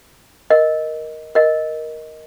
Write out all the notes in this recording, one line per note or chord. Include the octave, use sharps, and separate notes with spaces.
A#4 D#5
A#4 D#5